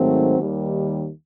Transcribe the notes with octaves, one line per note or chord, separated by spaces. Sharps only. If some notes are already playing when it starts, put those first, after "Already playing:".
Already playing: G#2 D#3 F#3 A3 C4
D#2 D#3 G3